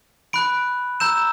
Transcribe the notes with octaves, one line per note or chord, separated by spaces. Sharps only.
B5 F#6 D7
A#5 E6 G6 E7